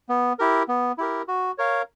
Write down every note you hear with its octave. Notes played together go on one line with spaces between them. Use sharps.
B3
E4 G4 A#4
B3
E4 G4 A#4
F#4
A#4 C#5 F5